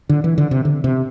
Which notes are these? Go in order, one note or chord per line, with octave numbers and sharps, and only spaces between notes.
D3
E3
D3
C3
D3
C3